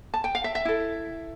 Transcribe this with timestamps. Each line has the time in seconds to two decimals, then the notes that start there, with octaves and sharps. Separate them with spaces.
0.14 A5
0.24 G5
0.35 F5
0.44 E5
0.55 E5
0.65 E4 A4